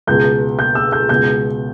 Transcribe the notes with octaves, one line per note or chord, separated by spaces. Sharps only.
C#2 B2 G6
G6
E6
G6
C#2 B2 G6